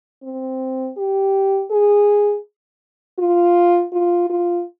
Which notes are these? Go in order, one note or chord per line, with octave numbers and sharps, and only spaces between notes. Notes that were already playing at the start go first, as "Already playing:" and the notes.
C4
G4
G#4
F4
F4
F4